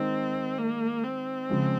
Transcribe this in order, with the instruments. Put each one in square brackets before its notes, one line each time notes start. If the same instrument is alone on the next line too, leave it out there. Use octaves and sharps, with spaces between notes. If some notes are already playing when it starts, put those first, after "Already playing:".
Already playing: [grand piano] D#3 G#3 D#4 [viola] C4
[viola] A#3
C4
[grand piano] C#3 F3 G#3